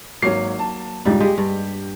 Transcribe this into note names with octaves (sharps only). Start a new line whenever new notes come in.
G#1 F#3 A#3 C#5 C7
A5
C#2 G#2 G3 F4
G#3 G4
G2